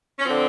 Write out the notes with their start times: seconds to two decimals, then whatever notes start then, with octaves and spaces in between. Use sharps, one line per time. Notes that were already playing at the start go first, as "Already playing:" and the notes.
0.19 C#4
0.25 D3 F3 C4